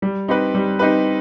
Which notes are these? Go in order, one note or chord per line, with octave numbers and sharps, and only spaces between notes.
G3
C4 D#4 G4 B4
G3
C4 D#4 G4 B4